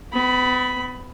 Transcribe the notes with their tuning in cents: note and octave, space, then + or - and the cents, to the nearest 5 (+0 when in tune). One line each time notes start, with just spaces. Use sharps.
B3 +40 B5 +0